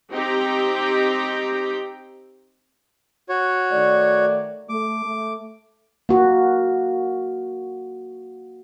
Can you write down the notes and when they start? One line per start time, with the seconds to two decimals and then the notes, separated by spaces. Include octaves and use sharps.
0.11 C4 D#4 G4 G5 A#5
3.29 F#4 C#5
3.71 D#3 A3 D5
4.69 A3 D6
5.04 A3
6.09 A#3 F#4